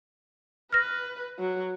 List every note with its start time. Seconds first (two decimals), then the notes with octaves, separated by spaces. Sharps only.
0.72 B4 F6 A#6
1.39 F#3